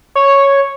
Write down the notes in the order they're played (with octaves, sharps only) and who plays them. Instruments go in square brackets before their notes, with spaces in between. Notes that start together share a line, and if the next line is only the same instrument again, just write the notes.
[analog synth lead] C#5